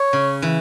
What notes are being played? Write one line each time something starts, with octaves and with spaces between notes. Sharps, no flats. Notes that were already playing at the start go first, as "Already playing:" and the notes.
Already playing: C#5
C#3
E3